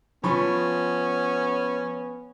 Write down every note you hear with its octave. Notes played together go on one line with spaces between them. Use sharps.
F3 B3 C#4 B5 C#6